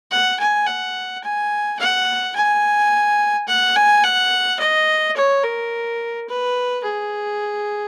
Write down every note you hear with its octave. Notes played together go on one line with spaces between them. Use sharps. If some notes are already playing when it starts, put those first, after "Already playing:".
F#5
G#5
F#5
G#5
F#5
G#5
F#5
G#5
F#5
D#5
C#5
A#4
B4
G#4